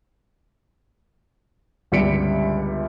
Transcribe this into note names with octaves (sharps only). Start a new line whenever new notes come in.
G1 C#2 G3 B6 C#7 D7